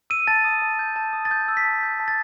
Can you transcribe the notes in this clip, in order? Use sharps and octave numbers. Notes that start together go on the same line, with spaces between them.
E6 D#7
A5 A6
D#6
A5
G6
A5
D#6
A6
A5 G6
E6
B6
A5
G6
A5
A6